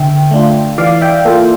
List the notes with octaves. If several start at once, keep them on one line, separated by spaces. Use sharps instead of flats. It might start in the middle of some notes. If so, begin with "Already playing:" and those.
Already playing: D3 E5 G5
A3 D4 F4
E3 D5 F5
E5 G5
A#3 F4 A4